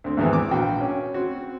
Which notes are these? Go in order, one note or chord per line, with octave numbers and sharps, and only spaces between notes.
D2 C4
E2 G#2 D#3 E3 B3
D6
A#1 F#4 G5
C#4
C4 F#4